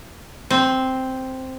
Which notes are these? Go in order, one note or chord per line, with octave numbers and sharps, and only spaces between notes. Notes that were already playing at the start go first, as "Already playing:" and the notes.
C4